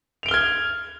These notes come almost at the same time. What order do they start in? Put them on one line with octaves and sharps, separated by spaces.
F7 D7 G7 F6 G#6